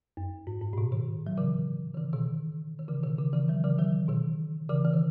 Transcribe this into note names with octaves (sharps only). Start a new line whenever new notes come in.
F#2
G#2
G#2
A2
B2
B2 D#3
F#3
C#3 E3
D#3
C#3 E3
B2 D#3
D#3
C#3 E3
B2 D#3
C#3
C#3 E3
D#3 F#3
C#3 E3
D#3 F#3
B2 D#3
C#3 E3
E3
D#3